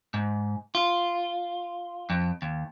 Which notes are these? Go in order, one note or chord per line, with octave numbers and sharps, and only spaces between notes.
G#2
F4
F2
D#2